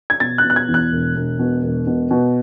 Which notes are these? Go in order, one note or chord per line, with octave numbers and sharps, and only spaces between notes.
G#6
B2 A6
F#6
B2
F#6
G#6
E2
F#6
E1
E1
B2
E1
B2
B2